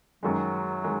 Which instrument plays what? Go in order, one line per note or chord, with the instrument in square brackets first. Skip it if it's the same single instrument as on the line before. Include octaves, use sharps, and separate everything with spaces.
[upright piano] F#2 D#3 G#3 [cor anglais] F#3
[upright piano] D#3 G#3